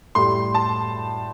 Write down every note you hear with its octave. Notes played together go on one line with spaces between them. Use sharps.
A2 G3 C6
A5